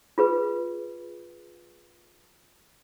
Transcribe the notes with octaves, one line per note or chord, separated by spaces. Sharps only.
F4 G#4 B4